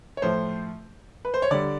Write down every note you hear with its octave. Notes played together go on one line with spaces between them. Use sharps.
C#5
A2 F3 A3 C5
B4
C5
C#5
D3 G3 D5